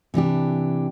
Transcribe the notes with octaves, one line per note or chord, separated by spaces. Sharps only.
C3 E3 D4 G4